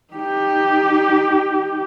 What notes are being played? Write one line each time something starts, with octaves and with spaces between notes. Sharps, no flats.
D#4 G4